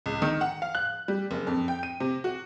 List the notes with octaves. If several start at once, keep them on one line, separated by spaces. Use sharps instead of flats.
C#2
D#3
F#5
F5
F#6
G3
F#1
F2
G5
D#7
C3
F#4